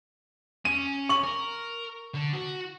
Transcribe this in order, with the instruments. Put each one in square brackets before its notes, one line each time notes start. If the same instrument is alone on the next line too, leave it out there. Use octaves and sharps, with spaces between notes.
[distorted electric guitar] C#4 [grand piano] D#7
[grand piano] C#6 F#7
[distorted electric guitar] A#4
D3
F#4